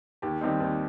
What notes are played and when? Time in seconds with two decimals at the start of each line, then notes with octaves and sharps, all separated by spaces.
0.22 D#2 G4
0.41 D#3 G3 C4 D#4
0.60 D#2